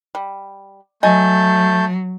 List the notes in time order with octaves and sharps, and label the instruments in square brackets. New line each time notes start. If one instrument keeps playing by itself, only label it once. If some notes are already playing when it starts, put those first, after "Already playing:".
[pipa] G3
[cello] F#3 [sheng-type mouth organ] A3 A5 G6 [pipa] D#5 G#5